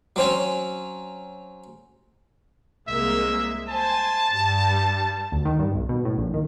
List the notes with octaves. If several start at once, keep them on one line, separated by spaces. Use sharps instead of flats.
F#3 C4 C#4
C2 G#3 A#3 E5
C5 G#5 A5
G2 G3
D2
D#3
G2
B1
B2
A2
A#1
D#3